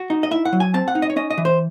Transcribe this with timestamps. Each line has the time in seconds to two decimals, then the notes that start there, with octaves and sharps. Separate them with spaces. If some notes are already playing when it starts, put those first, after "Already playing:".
Already playing: F#4
0.10 D#4
0.23 D#5
0.31 E4 E5
0.45 F#5
0.53 F#3
0.60 G#5
0.74 C4 A5
0.88 F#5
0.95 D#4
1.02 D#5
1.10 C#5
1.16 C#4 D#5
1.30 D#5
1.38 E3
1.45 C5